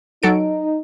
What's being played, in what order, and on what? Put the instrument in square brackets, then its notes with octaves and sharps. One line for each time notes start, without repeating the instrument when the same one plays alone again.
[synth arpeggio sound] F#3 A4 D7 [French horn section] D#4